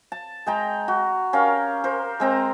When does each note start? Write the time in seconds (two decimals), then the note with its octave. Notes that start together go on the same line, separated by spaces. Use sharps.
0.12 A5
0.46 G#3 G5 A#5
0.88 F#4
1.33 C#4 G4 A#4 F5
1.84 A#4 C5
2.20 G#3 C4 A#5